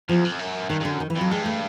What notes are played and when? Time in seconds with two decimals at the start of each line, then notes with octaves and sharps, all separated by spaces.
0.09 E2 F3
0.25 F2
0.39 F#2
0.69 G2 D#3
0.80 G2 D3
0.91 F#2
1.00 D#3
1.10 E3
1.15 F2
1.21 F#3
1.31 G2 G#3
1.46 A3